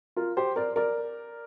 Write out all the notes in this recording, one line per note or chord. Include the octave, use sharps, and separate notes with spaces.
F4 A#4
G4 C5
A#4 D5
A#4 D5